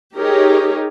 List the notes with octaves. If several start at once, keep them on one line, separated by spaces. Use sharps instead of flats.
D#4 G4 G#4 A#4 C#5